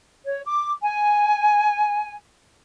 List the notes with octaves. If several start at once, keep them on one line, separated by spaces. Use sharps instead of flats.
C#5
D6
G#5